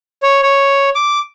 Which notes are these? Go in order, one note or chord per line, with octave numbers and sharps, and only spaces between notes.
C#5
C#5
D6